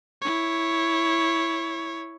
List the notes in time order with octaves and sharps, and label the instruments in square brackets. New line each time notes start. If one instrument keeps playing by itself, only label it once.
[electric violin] E4 C#5